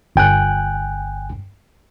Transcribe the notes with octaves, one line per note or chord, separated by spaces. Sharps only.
G1 G5 G#5 F#6